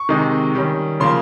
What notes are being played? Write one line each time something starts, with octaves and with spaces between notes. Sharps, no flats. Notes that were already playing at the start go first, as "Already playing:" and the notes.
Already playing: C#6
C3 D#3 G#3 D#4
D#3 G3 C#4
C#3 F3 A#3 C6